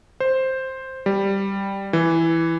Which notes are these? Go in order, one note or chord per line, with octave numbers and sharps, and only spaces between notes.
C5
G3
E3